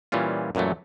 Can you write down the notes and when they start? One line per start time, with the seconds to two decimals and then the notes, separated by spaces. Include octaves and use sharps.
0.12 A#2 E3 G3 C#4 F4
0.55 F#2 A#2 E3 F#3 A3